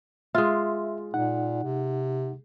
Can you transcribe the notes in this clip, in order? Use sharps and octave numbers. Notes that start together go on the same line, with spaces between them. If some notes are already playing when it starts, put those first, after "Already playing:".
G#3 F4 E5
A#2 D#4 F#5
C3